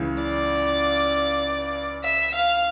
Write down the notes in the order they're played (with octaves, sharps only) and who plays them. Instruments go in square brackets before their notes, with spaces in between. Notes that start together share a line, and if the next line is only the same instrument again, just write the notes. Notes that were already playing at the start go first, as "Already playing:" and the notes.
Already playing: [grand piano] C#2 C#3 E3
[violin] D5
E5
F5